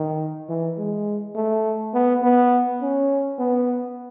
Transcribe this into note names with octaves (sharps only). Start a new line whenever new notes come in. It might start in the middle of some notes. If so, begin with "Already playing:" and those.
Already playing: D#3
E3
G#3
A3
B3
B3
C#4
B3